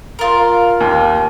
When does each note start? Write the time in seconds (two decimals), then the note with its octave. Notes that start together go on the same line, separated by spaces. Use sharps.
0.19 F4 A#4
0.80 D#2